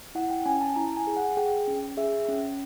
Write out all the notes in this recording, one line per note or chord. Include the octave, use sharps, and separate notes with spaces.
E4 F#5
G5
C#4 G#5
A5
E4 A#5
G#5
G#4
F#5
G#4 G5
C#4
G#4 E5
C#4